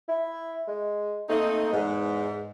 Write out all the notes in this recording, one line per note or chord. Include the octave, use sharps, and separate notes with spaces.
E4
G#3
A3 A#3 C4 D#4
E2 G#2